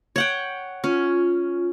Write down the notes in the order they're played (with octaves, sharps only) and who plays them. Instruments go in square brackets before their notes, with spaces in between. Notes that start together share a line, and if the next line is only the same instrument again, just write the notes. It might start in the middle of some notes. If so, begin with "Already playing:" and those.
[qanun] C#5 F#5 G5
[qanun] C#4 [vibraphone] F4